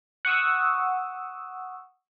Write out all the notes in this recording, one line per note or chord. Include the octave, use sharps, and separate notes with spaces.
F#5 C#6 D#6 E6